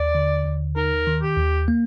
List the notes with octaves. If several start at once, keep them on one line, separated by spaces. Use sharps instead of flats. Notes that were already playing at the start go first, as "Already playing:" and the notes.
Already playing: D#2 D5
D3
D#2
D#4 A#4
D#3
G4
D#2
A#3